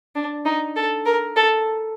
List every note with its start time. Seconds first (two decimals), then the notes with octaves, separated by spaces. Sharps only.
0.15 D4
0.45 D#4
0.76 A4
1.06 A#4
1.36 A4